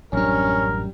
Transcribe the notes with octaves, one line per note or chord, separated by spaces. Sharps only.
A1 F#2 G3 C#4 D4 A#4